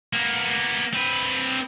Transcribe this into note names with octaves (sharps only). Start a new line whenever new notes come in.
A#3 B3
C4 B4